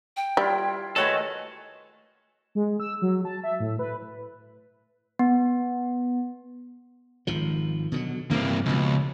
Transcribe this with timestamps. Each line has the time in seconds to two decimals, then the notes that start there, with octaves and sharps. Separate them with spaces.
0.17 G5
0.37 G3 E4 F4
0.96 D#3 A3 F#4 A4 B4 C#5 G#5
2.55 G#3
2.80 E6
3.02 F#3
3.25 A5
3.44 E5
3.60 A2
3.79 B4
5.19 B3
7.27 G#1 D#3 F3
7.92 B2 D3 F#3
8.31 G2 C3 E3 A#3 C4
8.66 C#2 B2 F3